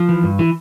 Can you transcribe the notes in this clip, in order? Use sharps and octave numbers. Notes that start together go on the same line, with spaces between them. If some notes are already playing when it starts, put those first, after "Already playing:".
Already playing: F3
E3
G2
E3